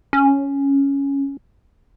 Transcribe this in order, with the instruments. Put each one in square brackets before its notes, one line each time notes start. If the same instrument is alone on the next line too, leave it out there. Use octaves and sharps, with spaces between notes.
[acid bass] C#4